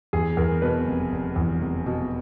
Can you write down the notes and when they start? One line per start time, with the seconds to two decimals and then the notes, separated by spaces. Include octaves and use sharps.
0.13 E2 G#4
0.37 E2 A#4
0.62 B2 B4
0.87 F1
1.12 F1
1.36 E2
1.61 F1
1.86 B2